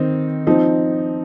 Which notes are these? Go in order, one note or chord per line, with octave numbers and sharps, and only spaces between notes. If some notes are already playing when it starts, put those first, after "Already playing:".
Already playing: D#3 C4 D#4
F3 C4 D#4